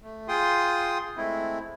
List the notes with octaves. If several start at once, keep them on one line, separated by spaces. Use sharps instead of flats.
A3
F4 G#4 G5 C6 D#6
G#3 A3 C4 E4